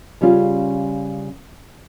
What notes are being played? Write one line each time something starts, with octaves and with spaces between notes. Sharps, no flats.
C#3 G3 C#4 F4